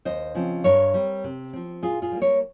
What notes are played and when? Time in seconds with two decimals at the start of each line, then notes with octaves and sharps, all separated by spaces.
0.05 D#2 C5 D#5
0.35 C#3 F3 C4
0.64 G2 A#4 C#5
0.94 G3 C4
1.24 C3
1.53 F3 C4
1.82 A#2 F4 G#4
2.02 F4 G#4
2.12 G3 A#3
2.22 A#4 C#5